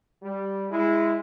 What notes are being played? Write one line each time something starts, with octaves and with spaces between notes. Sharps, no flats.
G3
G#3 E4